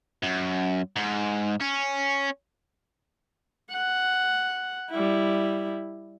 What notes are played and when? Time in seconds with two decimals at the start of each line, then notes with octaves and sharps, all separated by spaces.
0.23 F#2
0.96 G#2
1.61 C#4
3.72 F#5
4.91 G3 E4